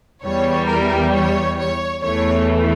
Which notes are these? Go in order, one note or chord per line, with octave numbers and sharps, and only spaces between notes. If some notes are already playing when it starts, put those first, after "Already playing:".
E2 E3 G3 C#5
A#4
C#5
C#5
E2 E3 A3 C#5